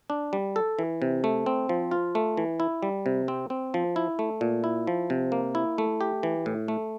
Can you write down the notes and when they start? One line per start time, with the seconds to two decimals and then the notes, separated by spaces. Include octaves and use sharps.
0.10 D4
0.33 G3
0.56 A4
0.79 E3
1.02 C3
1.24 A3
1.46 C4
1.69 F3
1.91 F4
2.15 A3
2.37 E3
2.60 E4
2.83 G3
3.06 C3
3.28 C4
3.50 C4
3.74 F3
3.96 E4
4.19 A3
4.41 A#2
4.64 E4
4.87 F3
5.10 C3
5.32 A#3
5.55 E4
5.78 A3
6.01 G4
6.23 E3
6.46 A2
6.68 A3